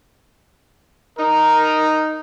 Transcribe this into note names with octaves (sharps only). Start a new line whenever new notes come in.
D#4 A#4